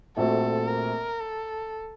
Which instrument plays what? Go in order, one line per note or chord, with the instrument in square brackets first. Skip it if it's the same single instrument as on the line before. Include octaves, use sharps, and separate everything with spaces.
[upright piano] A#1 A#2 A3 C4 F#4 [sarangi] A4
[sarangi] A#4
A4